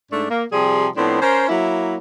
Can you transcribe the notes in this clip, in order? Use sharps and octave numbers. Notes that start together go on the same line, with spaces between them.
G#2 A3 D4
A#3
C3 F3 G3 G#4
A2 F3 B3 C4 D4
C#4 A#4 C5
F#3 A#3 E4